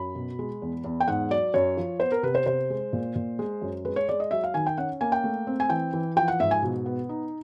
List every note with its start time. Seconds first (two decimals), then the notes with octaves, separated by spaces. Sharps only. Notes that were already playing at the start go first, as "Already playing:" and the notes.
Already playing: F#2 B5
0.15 B2
0.39 G#3
0.62 E2
0.84 E2
1.00 G5
1.08 G#2 F#5
1.30 F#3 D5
1.54 F#2 C#5
1.77 F3
2.00 B3 C5
2.12 A#4
2.23 C3 B4
2.35 C5
2.46 C3 C5
2.70 G#3
2.93 A#2
3.16 A#2
3.39 G#3
3.62 F#2
3.85 G#3 B4
3.96 C#5
4.09 G#3 D5
4.20 D#5
4.31 F#3 E5
4.44 F5
4.54 D#3 G#5
4.67 G5
4.78 C#4 F#5
5.01 A#3 G#5
5.12 G5
5.24 A3
5.47 C4
5.60 G#5
5.70 E3 G5
5.93 E3
6.16 F3 G5
6.28 F#5
6.40 G#2 E5
6.51 G#5
6.62 B2
6.86 B3
7.09 D#4